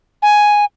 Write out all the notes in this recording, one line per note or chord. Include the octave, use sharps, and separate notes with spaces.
G#5